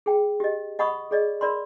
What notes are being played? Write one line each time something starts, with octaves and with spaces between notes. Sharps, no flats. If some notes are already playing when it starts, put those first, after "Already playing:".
G#4 G5
G4 D#5
D#5 F#5 B5 C#6 D#6
G#4 D5 D#5
A#4 D5 B5 C6